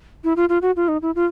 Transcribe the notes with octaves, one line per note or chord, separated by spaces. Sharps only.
E4
F4
F4
F#4
F4
D#4
E4
F4